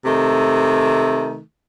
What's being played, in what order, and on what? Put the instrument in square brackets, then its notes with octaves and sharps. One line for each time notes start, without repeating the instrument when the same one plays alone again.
[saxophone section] C3 D#3 A3